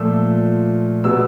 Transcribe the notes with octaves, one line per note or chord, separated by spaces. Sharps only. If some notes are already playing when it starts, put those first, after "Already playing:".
Already playing: A#2 F3 A3 E6
B2 G#3 B3 E6